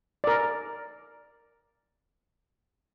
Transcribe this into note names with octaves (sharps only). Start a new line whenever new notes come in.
A#4 D5